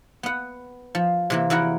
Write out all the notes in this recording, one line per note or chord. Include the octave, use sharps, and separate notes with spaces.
B3 F#5
F3
C3 E3 A#3
E2 E4 F#4 A#4 F#5